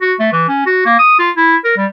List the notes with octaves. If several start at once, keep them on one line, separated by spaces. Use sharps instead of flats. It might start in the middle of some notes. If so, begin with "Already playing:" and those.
F#4
A3
E3
C#4
F#4
A#3
D#6
F4
E4
A#4
G3